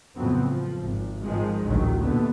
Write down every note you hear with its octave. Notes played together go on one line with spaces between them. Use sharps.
F2 A2 C#3 F#3 B3 C4
F3
G#1
G#2 D#3 F3 G#3
A1 D2 D#3 F#3
D#2 B2 D3 A3 B3